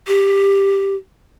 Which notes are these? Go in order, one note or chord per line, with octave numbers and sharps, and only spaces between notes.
G4